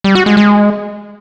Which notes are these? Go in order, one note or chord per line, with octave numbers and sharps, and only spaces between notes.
G3
F#4
G#3
G#3